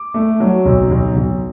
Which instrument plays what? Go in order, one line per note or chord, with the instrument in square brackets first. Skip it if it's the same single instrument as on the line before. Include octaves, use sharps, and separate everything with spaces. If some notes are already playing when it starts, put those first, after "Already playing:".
Already playing: [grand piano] D6
A3
F#3
B1
B1
B1